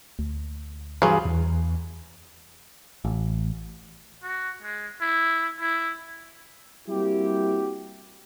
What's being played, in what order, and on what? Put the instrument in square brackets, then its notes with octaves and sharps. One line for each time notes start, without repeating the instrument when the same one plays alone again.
[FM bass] D2
[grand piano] G2 G#4 [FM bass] E3 [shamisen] F#3 F4
[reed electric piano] E2
[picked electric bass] A1
[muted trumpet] F#4
G#3
E4
E4
[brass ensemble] G3 A#3 C4 E4 F#4 G4